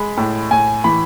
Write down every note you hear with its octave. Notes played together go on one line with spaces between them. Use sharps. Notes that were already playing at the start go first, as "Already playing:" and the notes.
Already playing: G#3 B5
A2
A2 G#5
E3 B5